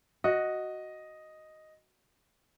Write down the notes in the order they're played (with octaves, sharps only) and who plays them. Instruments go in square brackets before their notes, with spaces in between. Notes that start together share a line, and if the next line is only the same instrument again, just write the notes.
[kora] F#4 [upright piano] D#5